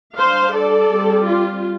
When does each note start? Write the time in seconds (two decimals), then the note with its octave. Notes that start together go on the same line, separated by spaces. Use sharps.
0.17 G3 D4 C5 F5
0.54 A4 D5
0.91 G3 C4
1.27 F4